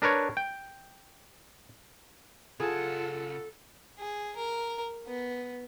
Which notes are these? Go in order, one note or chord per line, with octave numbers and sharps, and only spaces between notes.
D4 A#4 B4 C#5
G5
C#3 F4 G#4 A4 F#5 A5
G#4
A#4
B3